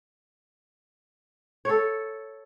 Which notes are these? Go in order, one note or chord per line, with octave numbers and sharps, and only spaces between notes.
A4 C#5